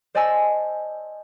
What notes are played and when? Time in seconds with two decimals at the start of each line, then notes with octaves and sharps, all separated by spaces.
0.15 C5 D5 D#5 G#5 A5 E6